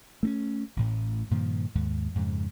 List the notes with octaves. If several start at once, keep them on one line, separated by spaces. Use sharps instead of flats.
A3 C4 C#4
A1 A2
G2 A#2 D#3 F3
D#2 G#2
F2 G#2 C#3